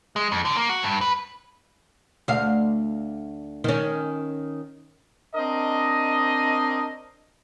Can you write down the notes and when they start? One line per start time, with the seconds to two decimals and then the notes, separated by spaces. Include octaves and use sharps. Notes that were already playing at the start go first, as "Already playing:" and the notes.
0.16 G#3
0.32 F2
0.45 D3
0.57 A#3
0.70 F#4
0.83 G2
1.01 B4
2.28 D2 F5
3.64 D#3 C#4
5.35 C4 D4 A#4 D#5